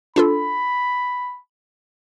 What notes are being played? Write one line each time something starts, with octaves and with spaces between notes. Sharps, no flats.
D4 F4 A4 B5